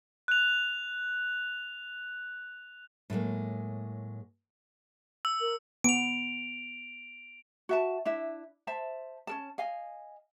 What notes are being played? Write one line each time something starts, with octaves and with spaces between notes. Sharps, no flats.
F#6 F7
A2 F#3 G#3 A#3
E6
A#4
B3 D7 F7
F#4 E5 A5
D4 E4 E5
C5 E5 A5
C#4 A#4 A5
D#5 F5 G#5